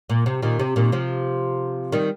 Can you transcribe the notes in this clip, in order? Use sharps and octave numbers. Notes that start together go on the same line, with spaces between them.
A#2
C3
A#2 D#3
C3
A#2 D#3
C3 F3
D#3 G3